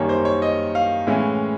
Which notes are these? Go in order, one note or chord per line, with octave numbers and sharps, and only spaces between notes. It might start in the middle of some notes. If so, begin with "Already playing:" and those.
Already playing: F#2 D#3 G3 A#3 C#5
C5
C#5
D#5
F5
A2 E3 G#3 C#4